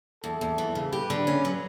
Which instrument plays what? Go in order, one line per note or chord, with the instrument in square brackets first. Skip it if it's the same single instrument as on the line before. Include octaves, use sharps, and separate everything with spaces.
[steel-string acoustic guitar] E2 [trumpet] A4
[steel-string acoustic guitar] E2
E3
C#3
[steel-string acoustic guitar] G4 [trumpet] B4
[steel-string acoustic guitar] D3
C#4
F#3